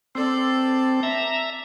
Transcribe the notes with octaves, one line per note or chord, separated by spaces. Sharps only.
C4 A4 D5
E5 A#5